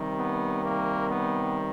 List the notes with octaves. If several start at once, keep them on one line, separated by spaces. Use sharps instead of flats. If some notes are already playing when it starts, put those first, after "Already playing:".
Already playing: C3 D#3 G3
B3
A#3
B3